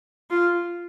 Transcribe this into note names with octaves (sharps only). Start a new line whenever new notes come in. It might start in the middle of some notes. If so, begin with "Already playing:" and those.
F4